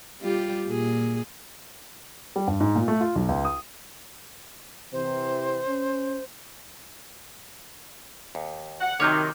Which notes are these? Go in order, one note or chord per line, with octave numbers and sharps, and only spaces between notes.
G3 F4 G4
A#2 G#4
G3
G2
G#2
A#2
A3
F4
B1
C#2
D#6
C3 E3 C5
C#4
D#2
F#5
C3 D#3 F#3 C#5 D6 F6 G6